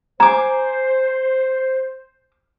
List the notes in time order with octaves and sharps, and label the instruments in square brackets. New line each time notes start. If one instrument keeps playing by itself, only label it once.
[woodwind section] C5 [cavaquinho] G#5 D6 [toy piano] A#5